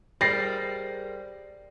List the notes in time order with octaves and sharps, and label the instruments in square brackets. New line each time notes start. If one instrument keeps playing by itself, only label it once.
[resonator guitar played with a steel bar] G3 [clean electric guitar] G#4 A#4 C5 [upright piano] A6 A#6 C7